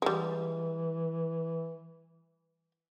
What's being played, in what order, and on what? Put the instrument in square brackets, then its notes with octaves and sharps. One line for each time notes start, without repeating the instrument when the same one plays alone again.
[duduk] E3 [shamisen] G3 G#3